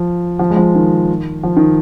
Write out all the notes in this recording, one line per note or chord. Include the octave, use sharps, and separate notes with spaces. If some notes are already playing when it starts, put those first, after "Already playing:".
Already playing: F3
F3
G#3
F3
D#3
F3
D#3